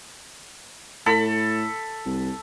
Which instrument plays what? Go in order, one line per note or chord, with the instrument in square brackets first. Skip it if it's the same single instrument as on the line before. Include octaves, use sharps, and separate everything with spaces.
[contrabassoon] A2 [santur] A4 B5
[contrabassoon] C2